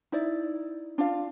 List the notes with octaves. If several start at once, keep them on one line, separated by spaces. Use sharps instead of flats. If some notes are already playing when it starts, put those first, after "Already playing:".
D#4 E4 D5
D4 F4 F5